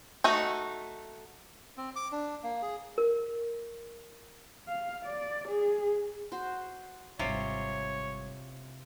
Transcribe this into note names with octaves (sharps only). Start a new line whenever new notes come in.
A3 D#4 F#4
C4
D6
D4
A#3
G#4
A#4
F5
D5
G#4
F#4 C5
G#1 C3 G3 F4 C#5